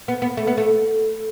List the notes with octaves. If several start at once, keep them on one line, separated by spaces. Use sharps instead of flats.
B3
B3
A3
B3
A3